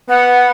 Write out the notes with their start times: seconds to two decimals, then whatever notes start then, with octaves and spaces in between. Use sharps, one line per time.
0.09 B3 F#5